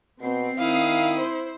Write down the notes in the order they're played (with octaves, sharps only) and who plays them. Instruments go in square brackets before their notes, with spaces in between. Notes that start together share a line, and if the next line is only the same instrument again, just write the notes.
[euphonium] B2 [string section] C4 C7
[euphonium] D#3 [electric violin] E4 [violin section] F5 D#6
[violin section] C5